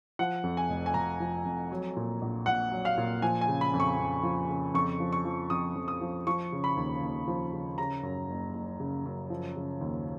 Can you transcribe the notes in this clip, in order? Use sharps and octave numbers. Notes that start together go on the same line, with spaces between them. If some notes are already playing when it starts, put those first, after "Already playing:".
F3 F#5
F2
G#5
F1
G#5
F1 A#5
F3
F2
F#3
A#2
A#1
A#1 F#5
F#3
F5
A#2
F3 G#5
G#5
C#3
B5
F2
C#6
F2
F3
C#3
F2 C#6
F3
C#6
F3
F2 D#6
F2
D#6
F3
F3 C#6
C#3
B5
D#2
D#2
F3
C#3
C#3 A#5
F#2
F#1
F#1
C#3
F#2
F3
C#3
D#2